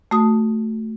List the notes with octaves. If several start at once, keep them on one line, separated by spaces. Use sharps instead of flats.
A3 F#4 A5 D#6